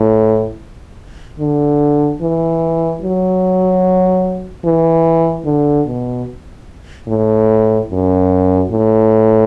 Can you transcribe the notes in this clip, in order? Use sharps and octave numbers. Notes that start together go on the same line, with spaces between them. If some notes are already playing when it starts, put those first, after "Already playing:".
Already playing: A2
D3
E3
F#3
E3
D3
B2
A2
F#2
A2